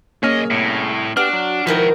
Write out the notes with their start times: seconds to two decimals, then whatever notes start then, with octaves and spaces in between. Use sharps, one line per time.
0.23 B1 A#3 C#4 G#4 C#5 D#5 G#5 F6
0.51 C2 A2
1.17 B3 D4 F#4 G4 F6
1.33 F#3
1.67 B2 D#3 F3 E4 A#4 B4 G5